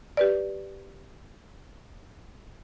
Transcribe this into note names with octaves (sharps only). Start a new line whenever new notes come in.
G4 B4 D5